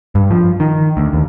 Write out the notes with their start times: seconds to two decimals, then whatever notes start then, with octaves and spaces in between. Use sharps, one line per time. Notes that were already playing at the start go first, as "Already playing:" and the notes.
0.15 G2
0.30 F3
0.60 D#3
0.97 D2
1.13 D#2